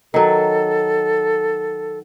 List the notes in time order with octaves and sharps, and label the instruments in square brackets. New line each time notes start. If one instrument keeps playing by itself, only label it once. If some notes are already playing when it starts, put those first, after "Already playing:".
[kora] D#3 F#3 [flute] A4